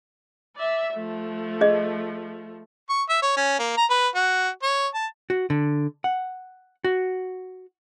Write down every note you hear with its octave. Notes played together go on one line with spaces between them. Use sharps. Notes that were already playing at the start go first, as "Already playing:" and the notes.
D5 E5
F3 A3
G#4 D#5
C#6
E5
C#5
C#4
A#3
A#5
B4
F#4
C#5
A5
F#4
D3
F#5
F#4